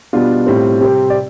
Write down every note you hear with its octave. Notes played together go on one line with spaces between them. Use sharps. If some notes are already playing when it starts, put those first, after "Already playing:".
B2 G3 B3 D4 F4
A2 G3 C4
C3 G3 C4 G4
D5